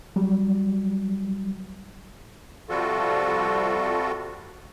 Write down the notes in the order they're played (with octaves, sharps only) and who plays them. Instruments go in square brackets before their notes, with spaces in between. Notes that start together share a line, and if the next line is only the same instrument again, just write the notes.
[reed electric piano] F#3 G3
[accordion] C3 F3 G3 F4 F#4 A4